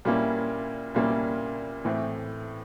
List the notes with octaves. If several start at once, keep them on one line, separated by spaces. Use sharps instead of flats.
A#2 G3 A#3 C#4 E4
A#2 G3 A#3 C#4 E4
A2 E3 A3 C4